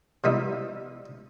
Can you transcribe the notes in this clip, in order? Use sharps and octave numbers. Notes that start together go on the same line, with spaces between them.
C3 G3 B3 D#4 E4